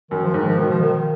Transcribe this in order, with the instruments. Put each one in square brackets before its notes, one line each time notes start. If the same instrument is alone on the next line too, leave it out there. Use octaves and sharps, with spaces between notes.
[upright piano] F#2 [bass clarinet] D#3
[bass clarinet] F3
[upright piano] G#2 [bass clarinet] D#3
[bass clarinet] F3
[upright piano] B2 [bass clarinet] D#3
[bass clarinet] F3
D#3